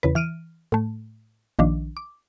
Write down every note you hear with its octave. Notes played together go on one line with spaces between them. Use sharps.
E2 C#3 B4
E3 F6 D7 D#7
A2 A3
A#1 D#3 F3 D4
D6